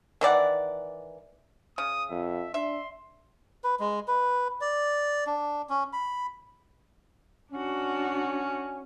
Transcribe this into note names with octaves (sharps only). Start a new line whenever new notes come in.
D#3 E3 D5 F#5
C#3 D#6
F2 E5
D4 E5 C6
B4
G#3
B4
D5
D4
C#4
B5
C#4 D4 F#4